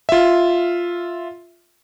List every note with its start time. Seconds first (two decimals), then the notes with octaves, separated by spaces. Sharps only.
0.09 F4 E5